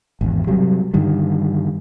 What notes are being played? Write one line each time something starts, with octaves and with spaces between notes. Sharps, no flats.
G#1 E2
C3 F#3 G3
G2 D3 D#3 G3